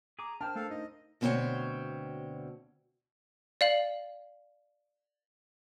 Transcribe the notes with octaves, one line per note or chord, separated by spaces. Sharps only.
G#4 A#5 D6
D4 A#4 C5 G5 A5 F6
A3 A4 F5
D#4 D#5
D2 B2 C4 D#4 C#5 G5
D5 F5 F#7